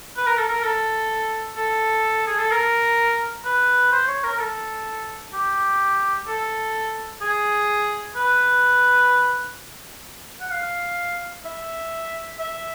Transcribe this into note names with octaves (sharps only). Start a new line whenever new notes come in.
B4
A#4
A4
A#4
A4
A4
G#4
A4
A#4
B4
C5
C#5
A#4
A#4
A4
G4
A4
G#4
B4
F#5
F5
E5
E5